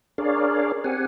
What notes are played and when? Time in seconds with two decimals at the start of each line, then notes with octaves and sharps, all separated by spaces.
0.18 D4 G#4 A#4 C#5 D5 F5
0.84 C4 G4 F#5 G#5